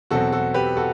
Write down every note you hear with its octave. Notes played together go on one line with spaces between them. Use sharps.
E2 B2 F#3 C4 F#4 A4
F#4 A4
G4 B4
F#4 A4